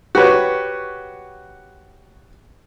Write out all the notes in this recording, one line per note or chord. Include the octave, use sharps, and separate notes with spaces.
F#4 G4 B4 C#5